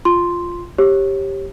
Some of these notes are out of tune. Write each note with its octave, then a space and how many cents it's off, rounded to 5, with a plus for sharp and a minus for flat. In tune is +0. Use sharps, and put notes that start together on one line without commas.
F4 +0 C6 +0
G4 +0 C#5 -25